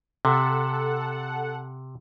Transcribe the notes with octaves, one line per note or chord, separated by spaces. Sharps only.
C3 A4 F#5